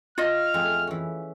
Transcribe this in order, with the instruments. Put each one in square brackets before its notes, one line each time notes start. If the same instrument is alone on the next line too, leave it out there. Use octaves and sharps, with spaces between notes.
[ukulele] F4 D#5 [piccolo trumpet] F6
[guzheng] F2 A3 G#4
E3 C#4